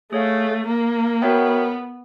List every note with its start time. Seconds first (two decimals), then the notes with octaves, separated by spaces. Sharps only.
0.12 A3 G#4 C#5 F5
0.67 A#3
1.22 B3 F#4 A#4 C#5 E5 G5